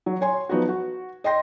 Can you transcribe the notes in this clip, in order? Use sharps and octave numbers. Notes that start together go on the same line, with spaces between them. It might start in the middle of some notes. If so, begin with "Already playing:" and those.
F#3
C#5 G#5 C6
F3 F#3 B3 D#4 F#4
F#4
D#5 G5 C6 A#6